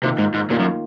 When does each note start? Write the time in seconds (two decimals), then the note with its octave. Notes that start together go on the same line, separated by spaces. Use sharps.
0.03 C3 D#3 A#3 F4
0.18 G#2
0.34 G#2
0.50 A#2 D#3 A#3 F4
0.59 F#2